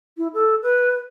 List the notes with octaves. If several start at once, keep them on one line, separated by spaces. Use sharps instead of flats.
E4
A4
B4